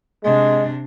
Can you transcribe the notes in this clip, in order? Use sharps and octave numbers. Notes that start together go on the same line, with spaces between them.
C3 G#3 D4